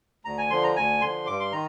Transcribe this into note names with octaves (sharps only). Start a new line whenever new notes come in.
D2 A#5
G#5
D3 F3 C6
A#5
D2 G#5
D3 F3 C6
G2 D6
C6
D#3 A#5